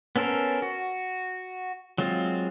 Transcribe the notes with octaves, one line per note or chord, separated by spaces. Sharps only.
B3 C#4 A4 A#4 C5
F#4
F#3 G#3 C4 F4